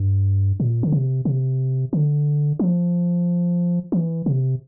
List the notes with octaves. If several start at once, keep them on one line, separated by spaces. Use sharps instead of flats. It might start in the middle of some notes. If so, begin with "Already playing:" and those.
Already playing: G2
A#2
D3
C3
C3
D3
F3
E3
C3